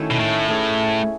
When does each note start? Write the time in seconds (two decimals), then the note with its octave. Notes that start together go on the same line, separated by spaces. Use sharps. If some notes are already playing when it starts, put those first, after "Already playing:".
Already playing: D#3 A3 C#4 E4 F#4
0.11 B2
0.20 A2
0.48 A3 C#4 G#4 B4